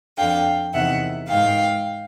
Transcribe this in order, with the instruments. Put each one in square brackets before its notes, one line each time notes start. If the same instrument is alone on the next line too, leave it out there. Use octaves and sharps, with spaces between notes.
[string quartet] F2 D3 F5 G5
E2 C3 D#3 E5 F#5
G#2 D#3 F5 G5